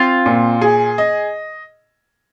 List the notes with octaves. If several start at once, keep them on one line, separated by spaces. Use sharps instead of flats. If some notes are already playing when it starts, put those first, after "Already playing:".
Already playing: C4 F4
A#2
G#4
D#5